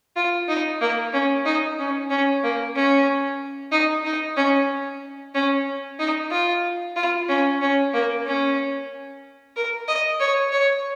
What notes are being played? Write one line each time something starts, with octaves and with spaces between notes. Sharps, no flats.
F4
D#4
A#3
C#4
D#4
C#4
C#4
A#3
C#4
D#4
D#4
C#4
C#4
D#4
F4
F4
C#4
C#4
A#3
C#4
A#4
D#5
C#5
C#5